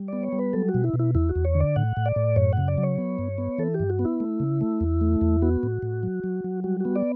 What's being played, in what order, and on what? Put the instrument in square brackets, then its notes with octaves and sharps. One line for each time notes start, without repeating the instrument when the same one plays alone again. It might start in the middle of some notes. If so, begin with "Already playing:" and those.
Already playing: [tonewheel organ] G3
B3 D5
C#5
G3
B4
F#3 A4
F#4
B2
E4
B2
E4
E2 E4
F#4
E2
C#5
D3
D5
A2 F#5
A2
D5
A2
F#2 C#5
C#3 F#5
D5
F#3
C#5
B3
G2
B3
E3 A4
G4
G2
F#4
B3
E4
A3
C#3
A3
E2
A3
E2
B3 F#4
A2
A2
F#3
F#3
F#3
G3 F#4
B3 F#4
D5